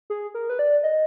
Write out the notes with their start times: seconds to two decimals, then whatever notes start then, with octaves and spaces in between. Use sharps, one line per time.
0.10 G#4
0.34 A#4
0.50 B4
0.59 D5
0.83 D#5